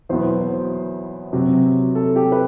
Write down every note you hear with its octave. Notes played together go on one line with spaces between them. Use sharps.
E2 B2 F#3 B3 E4 C5
C5
C3 F#3 C4
A4
G4
B4